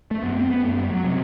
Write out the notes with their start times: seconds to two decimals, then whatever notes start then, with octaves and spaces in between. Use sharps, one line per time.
0.11 A3
0.23 F#2 B3
0.36 C4
0.50 B3
0.63 F#2 A3
0.78 G3
0.91 F#3
1.04 C3 F#3